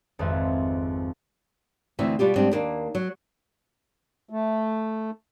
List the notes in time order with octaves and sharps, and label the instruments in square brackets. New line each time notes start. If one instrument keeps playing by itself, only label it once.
[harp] G#1 F2 G#3 B4 C5 E5
[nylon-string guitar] D2 E3 C4 E5
B2 G3 F4 G4
G#2 G3 C4 D4
D#2 A#3 D4
F#3
[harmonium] A3